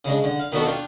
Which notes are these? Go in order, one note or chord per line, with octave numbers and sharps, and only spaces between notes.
C#3 G#3 D4
D3
F5
D#3 B3 D4 F#4 A4
D4 F4 G5